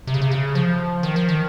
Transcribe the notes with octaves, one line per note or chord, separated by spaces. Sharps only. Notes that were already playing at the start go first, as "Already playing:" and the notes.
C3
C#3
C3
C#3
F3
D#3
F3
D#3